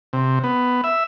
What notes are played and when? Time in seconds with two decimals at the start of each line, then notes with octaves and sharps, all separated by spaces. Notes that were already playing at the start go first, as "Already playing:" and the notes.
0.13 C3
0.44 B3
0.84 E5